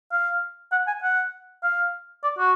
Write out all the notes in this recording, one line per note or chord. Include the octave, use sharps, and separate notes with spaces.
F5
F#5
G#5
F#5
F5
D5
F#4